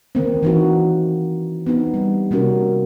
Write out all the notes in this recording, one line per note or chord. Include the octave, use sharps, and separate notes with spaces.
D#3 A#3 C4
E3 D#4 F#4
B3 C4 D#4
G3
C3 A#3 C#4 F#4 A#4